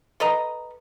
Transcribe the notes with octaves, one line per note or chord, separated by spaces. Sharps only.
A4 B4 D#5 A#5